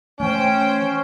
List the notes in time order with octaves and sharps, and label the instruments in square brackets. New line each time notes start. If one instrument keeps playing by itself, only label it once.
[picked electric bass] E3 A3 [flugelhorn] C#4 [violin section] C5 G5